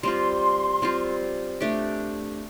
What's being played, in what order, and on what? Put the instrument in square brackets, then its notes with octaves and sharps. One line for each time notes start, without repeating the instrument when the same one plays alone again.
[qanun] G3 C4 F4 [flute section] C6
[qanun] G3 C4 F4
A3 D4 G4